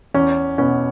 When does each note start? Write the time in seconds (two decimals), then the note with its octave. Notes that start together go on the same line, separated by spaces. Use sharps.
0.14 E2 C#4
0.58 B2 B3 C#4